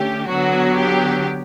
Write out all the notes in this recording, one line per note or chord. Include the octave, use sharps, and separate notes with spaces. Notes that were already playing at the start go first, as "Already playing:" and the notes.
Already playing: D3 A3 C#4 G4
D3 F#3 B3 F#4
G4